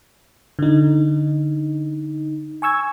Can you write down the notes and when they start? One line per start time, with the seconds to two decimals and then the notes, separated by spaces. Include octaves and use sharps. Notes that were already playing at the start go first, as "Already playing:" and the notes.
0.59 D3 D#4
2.62 G#5 C#6 E6 G#6